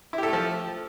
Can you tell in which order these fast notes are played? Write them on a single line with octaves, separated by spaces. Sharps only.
E4 G4 A4 A3 F3